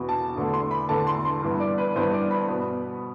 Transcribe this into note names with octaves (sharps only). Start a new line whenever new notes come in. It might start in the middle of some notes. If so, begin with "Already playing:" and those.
Already playing: E2 B2 B3
A5
E2 D3 A3
C6
B5
E2 D3 A3 A5
C6
C6
G2 E3 B3
D5
B4
G2 E3 B3 C5
D5
B5
B2 B3